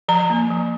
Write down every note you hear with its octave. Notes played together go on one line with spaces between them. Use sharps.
F3 A#5
A#3
F3